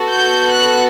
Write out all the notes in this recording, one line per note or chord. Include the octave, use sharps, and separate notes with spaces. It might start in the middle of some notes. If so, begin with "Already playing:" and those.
Already playing: B3 F#4 A4
G6
F#6